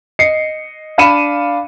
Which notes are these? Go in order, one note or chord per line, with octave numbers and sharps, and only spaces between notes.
D#5 C7 C#7
D4 F5 B5 C#7 D#7 E7